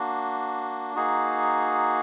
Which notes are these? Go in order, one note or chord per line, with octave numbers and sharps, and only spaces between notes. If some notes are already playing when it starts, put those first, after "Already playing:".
Already playing: A#3 D4 F#4
A#3 D#4 F#4 G#4